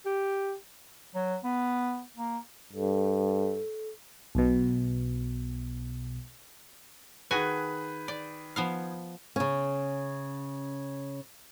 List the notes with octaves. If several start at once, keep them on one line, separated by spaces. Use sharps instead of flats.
G4
F#3
B3
A#3
G2 A4
B1 B2
D#3 F#4 G#4 B4 G#5
D5
F3 B3 F5
C#3 C#4